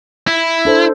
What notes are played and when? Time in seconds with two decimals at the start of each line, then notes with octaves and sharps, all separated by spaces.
0.27 E4
0.65 D4 A4 C5